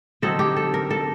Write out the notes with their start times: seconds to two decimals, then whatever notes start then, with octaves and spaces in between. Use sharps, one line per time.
0.22 D3 F#3 C4 D#4 A4
0.39 G4
0.57 A4
0.74 A#4
0.91 A4